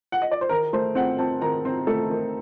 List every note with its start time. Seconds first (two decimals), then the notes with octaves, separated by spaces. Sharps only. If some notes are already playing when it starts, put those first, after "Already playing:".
0.12 F#5
0.22 D#5
0.31 D5
0.41 C5
0.49 D#3 A#4
0.73 A3 C5
0.95 C4 F#5
1.18 C4 A5
1.42 D#3 A#5
1.65 C4 C5
1.87 A3 A4
2.10 D#3